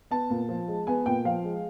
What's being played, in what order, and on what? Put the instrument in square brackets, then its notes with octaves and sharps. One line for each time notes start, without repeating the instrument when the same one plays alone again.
[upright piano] B3 A5
A#2
F3
G#3
B3 G#5
A#2 G5
F3 F5
G#3